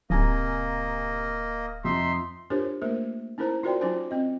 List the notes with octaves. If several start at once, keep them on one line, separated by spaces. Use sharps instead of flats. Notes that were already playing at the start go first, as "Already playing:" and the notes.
D1 C3 A#3 D#5 G#5 A#5
F2 D#4 E5 C6
D4 F4 G4 A#4 C5 C#5
A3 A#3 A#4 C5
C#4 D#4 E4 A#4 C5 A#5
F4 F#4 A#4 C5 D5 G5
F#3 C#4 D#4 F4 C5 G#5
C4 D#5